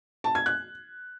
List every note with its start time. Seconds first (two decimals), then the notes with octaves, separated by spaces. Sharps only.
0.24 A5
0.35 G#6
0.46 F#6